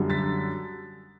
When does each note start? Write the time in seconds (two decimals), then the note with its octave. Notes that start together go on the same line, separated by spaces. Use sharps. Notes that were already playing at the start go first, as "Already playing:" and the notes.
Already playing: F#2 D3 G3
0.10 A6 B6